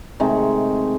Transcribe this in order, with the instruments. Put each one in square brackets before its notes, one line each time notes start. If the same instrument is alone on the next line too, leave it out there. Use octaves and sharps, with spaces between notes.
[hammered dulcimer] C3 D#3 G#3 A3